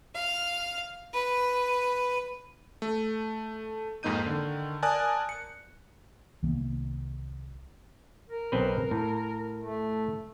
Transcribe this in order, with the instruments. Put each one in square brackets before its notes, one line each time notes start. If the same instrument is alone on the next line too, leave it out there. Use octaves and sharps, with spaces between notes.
[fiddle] F5
B4
[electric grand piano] A3
F2 G#2 A#3 D#4 G6 D#7
D3 D#3
A#4 D5 G#5 A5 D#6 F#6
C#7
[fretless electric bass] C2 D#3 A#3 B3
[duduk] A#4
[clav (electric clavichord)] B1 C4 B4
A2
[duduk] A3